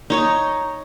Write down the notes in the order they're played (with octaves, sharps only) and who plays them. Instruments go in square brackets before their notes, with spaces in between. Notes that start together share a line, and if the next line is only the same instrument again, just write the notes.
[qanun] D#4 C#5 C#6